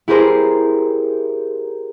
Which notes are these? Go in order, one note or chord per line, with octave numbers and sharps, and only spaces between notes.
E4 G4 G#4 A#4 C5